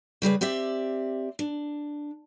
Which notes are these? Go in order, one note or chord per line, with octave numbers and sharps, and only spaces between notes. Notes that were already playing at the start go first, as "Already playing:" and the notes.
C#3 G3 G#4 B4
C4 G4 D5 E5
D4